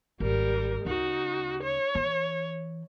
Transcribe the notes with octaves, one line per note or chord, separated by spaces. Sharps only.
G#1 G3 A#4
D2 C#3 D#4 F#4
C#5
E3